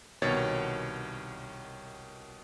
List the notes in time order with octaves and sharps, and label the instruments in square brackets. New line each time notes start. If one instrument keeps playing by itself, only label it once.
[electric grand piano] C2 B2 D#3 C#5 A6